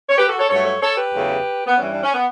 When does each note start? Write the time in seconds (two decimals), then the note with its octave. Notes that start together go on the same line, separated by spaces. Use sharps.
0.10 C#5
0.17 G4 B4
0.28 F#4 A4
0.38 A4 C#5
0.49 G2 F#3 A3 A4 C#5
0.65 A4 C#5
0.81 A4 C#5
0.97 G4 B4
1.14 E2 C#3 F#3 A3
1.66 B3
1.77 G2 E3 G3 C#4
1.94 D4
2.04 C#4
2.14 B3